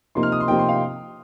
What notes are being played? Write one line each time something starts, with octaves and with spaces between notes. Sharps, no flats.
C3 F3 A#3 D#4 C6
F6
D#6
C6
C3 F3 A#3 D#4 G5
C6
F5